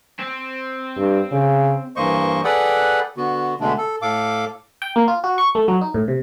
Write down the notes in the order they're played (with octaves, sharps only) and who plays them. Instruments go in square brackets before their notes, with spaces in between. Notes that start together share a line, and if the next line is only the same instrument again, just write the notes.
[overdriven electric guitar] C4
[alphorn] G2
C#3
[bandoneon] G2 E3 A#3 C5 D#5 C#6
G#4 A4 B4 D5 F#5 G5
D3 B3 F#4
B2 D3 G#3 A3 D4
A4
A2 A4 F5 D6
[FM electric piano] G5
A#3
F4
F#4
C#6
A3
F#3
D#4
A2
C3